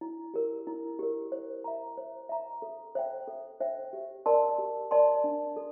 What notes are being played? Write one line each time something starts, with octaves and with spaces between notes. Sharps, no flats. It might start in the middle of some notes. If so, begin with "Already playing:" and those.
E4
G4 A#4
E4
G4 A#4
C5
E5 A#5
C5
E5 A#5
A4
C5 E5 G5
A4
C5 E5 G5
G4
A#4 D5 A5 C6
G4
A#4 D5 A5 C6
D4
A4